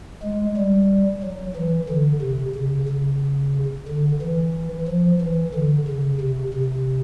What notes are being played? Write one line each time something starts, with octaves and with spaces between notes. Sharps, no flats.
G#3
G3
F#3
E3
D3
C3
C#3
C#3
D3
E3
F3
E3
D3
C#3
C3
C3